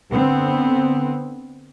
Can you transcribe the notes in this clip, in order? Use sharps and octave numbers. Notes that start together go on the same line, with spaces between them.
D3 B3 C4